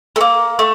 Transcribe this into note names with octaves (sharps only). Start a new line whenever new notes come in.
A3
A#3
A3